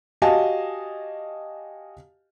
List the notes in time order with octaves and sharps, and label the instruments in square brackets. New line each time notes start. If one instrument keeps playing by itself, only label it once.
[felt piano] F#4 G4 D#5 F5 G#5 A5